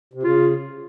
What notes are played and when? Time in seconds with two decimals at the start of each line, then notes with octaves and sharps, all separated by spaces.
0.14 C3
0.23 C#3 F4